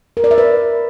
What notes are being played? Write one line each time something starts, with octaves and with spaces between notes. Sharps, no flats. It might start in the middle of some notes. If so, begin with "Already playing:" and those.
A#4
D5
E5
B4